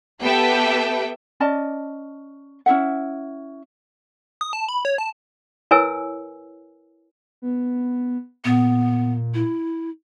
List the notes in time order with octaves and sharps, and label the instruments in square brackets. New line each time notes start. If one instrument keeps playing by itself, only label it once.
[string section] B3 G4 A4 B4 E5 G5
[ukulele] C#4 D5 D#5 A5
C#4 E4 E5 F#5
[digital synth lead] D#6
A5
B5
C#5
A5
[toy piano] E4 A#4 B4 C#5 G#5 E6
[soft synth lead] B3
[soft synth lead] A#2 [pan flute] B3
[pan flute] E4